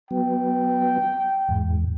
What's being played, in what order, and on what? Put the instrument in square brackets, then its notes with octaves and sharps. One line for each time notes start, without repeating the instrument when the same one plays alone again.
[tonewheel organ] F#3 B3 [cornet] G5
[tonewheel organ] E2 G#2